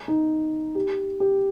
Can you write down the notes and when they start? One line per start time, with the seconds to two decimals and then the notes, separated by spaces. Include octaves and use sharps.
0.08 D#4
0.75 G4
1.20 G4